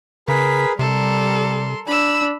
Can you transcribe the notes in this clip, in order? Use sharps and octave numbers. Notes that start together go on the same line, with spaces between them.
C#3 G#4 A#4 B4 B6
C3 G3 A4 A#4 C6
D4 B5 E6